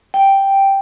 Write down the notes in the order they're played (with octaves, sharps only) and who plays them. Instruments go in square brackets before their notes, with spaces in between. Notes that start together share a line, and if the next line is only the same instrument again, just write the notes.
[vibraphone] G5